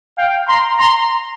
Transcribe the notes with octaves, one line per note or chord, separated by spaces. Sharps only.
F5 G5
A#5 C6
A#5 C6